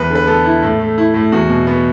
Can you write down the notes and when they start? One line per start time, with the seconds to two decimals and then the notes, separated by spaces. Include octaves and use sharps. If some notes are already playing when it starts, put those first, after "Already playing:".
Already playing: E2 B4
0.10 D3 B4
0.27 B3 A4
0.45 E4
0.62 A2
0.80 A3
0.98 E4
1.14 A2
1.32 E2 F#4
1.50 B2
1.67 B3